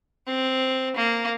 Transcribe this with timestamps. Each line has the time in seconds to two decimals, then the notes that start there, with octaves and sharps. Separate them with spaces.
0.27 C4
0.96 A#3